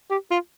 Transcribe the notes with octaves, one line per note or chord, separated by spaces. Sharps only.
G4
F4